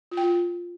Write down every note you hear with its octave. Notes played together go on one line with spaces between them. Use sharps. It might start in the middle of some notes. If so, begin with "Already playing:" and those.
F4
G5
F4